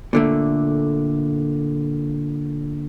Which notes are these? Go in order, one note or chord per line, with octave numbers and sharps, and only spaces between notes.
A#2 D3 A3